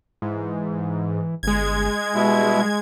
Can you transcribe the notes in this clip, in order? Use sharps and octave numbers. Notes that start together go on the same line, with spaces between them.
G#2 E3
G1 G#3 G#6
B2 G3 E4